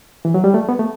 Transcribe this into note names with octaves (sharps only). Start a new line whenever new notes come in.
E3
F#3
G3
A3
B3
A3